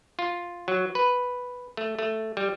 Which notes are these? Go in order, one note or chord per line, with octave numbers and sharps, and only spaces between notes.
F4
F#3
B4
A3
A3
G3